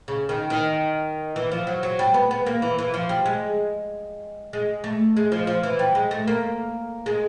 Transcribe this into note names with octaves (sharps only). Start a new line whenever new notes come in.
C#3
D#3
D#3
E3
F3
F#3
F#3
G3
B3
B3
A#3
E3
E3
F3
G3
G#3
G#3
A3
G#3
F3
F3
E3
G3
G#3
A3
A#3
G#3